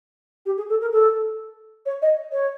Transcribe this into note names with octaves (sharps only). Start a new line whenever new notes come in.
G4
G#4
A4
A#4
A4
C#5
D#5
C#5